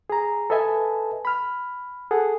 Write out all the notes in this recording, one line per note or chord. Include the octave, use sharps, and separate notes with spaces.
G#4 A#5
A4 B4 D#5 E5 G#5 A5
B5 F6
G#4 A4 F#5